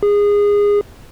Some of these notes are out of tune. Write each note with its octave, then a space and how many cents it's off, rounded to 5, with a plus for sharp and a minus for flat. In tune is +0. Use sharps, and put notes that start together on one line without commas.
G#4 -20